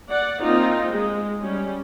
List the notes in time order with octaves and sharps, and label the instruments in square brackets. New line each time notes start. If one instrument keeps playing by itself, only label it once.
[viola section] D5 F#5
A#3 C4 D#4 F4
G#3
G3 C#4